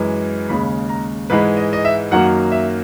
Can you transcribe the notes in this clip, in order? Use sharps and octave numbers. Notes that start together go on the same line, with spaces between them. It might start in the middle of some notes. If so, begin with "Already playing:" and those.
Already playing: F#2 E3 G#3
D#2 C#3 G#3 B5
A#5
G#2 E3 G#3 B4
D#5
D#5
E5
F#2 D#3 F#3 A#3 F#5
E5